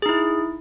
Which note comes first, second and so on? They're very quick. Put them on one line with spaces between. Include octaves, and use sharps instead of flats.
G#4 D#4 E4